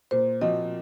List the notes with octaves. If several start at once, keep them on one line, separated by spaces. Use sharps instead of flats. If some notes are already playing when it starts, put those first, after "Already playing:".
A#2 C5
F3 C4 F#4 D#5